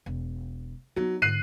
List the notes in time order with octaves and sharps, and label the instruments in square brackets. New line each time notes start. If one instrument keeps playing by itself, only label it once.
[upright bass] E1
[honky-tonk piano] F#3 [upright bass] B3 D#4
[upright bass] G#2 D3 [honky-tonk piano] F#6 C7 D#7